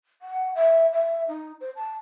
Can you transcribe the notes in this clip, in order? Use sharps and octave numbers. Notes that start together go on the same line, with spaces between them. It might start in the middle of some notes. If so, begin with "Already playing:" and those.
F#5
E5
E5
D#4
C5
A5